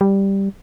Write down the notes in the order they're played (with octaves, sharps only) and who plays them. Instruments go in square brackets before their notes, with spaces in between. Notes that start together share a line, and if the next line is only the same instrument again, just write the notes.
[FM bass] G3